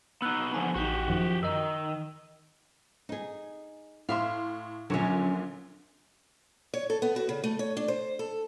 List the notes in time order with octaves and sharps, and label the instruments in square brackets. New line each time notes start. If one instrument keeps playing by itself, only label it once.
[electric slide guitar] B3 D#4 [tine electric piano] E6 F#6
[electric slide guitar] D3 F3 B3 [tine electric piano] G#5
[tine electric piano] A1 D#4 [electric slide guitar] F#4 G4
[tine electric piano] F#2 D#3 F3
[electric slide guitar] D#3 [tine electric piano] D#5 E6
[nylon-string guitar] D#4 G#4
[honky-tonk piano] A2 C6 [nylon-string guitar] E5 F5
[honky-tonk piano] A#1 A#2 D3 [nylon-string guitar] F#3 C#4
[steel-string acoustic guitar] C#5
A4
B3
F#4
C#3
A3
C#5
D4
C5
A4